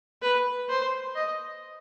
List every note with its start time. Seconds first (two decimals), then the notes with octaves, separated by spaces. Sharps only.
0.22 B4
0.69 C5
1.15 D#5